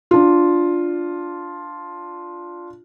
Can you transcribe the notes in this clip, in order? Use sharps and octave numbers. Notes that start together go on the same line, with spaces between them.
D4 F4